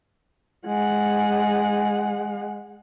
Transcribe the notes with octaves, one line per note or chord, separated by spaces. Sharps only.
G#3 F#5